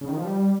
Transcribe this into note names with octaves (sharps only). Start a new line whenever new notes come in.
C#3
D#3
F3
G3